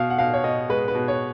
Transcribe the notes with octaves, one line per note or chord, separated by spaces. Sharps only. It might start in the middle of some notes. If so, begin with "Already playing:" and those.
Already playing: B2 F5
F#5
B2 F5
C#5
B2 D#5
G#3 B4
B4
B2
C#5